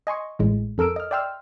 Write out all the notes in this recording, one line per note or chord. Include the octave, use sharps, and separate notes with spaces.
D#5 G#5 C6 C#6
A1 A2 G#3
F2 A4 A#4 E6 D7
D#5 F6
D5 E5 G5 C6 E6 F6